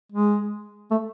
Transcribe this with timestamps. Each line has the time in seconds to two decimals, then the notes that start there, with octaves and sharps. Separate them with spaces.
0.12 G#3
0.91 A3